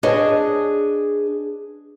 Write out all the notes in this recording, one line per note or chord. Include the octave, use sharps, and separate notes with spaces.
D4 G#4 B4 C#5 D#5 A5